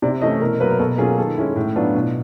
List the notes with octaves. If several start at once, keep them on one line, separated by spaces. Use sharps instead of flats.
C3 D5
E3 A3 C#4 D#5
B2 A#4
F#3 A#3 B4
A#4
B2 A4
F#3 A#3 C#4 F4 G#4
D#3 A4
G#3 C#4 E4
A2
F#3 B3 D4 F4
B2